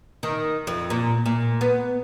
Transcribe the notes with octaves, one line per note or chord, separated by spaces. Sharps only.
D#3
F2
A#2
A#2
B3